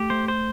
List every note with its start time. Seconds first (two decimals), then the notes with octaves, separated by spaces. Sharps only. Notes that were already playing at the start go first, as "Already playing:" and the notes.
Already playing: A3 G4
0.10 A3 C5
0.28 C5